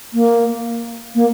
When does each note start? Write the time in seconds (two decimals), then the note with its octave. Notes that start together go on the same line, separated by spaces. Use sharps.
0.13 A#3
1.15 A#3